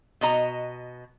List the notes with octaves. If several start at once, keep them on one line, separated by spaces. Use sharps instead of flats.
B2 F#4 D#5 A#5